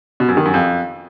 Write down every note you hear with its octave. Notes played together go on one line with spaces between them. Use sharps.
B2
F#2
D#3
F#2
F2